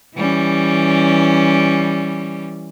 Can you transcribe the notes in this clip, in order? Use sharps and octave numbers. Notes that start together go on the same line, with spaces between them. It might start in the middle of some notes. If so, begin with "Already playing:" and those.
E3 G3 C#4